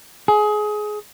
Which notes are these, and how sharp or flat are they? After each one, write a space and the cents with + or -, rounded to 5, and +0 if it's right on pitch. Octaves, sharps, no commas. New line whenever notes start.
G#4 +20